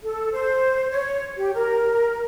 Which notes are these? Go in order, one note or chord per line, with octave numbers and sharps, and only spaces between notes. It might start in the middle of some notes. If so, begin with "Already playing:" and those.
A4
C5
C#5
G4
A#4